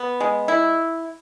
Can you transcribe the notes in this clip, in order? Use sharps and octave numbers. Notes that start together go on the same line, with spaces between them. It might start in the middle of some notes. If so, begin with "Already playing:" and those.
Already playing: B3
G#3
E4